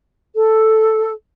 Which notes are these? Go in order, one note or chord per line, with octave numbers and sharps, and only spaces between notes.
A4